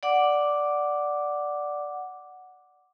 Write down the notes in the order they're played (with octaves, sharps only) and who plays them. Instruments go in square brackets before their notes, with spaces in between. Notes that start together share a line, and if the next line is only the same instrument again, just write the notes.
[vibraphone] D5 F#5 D6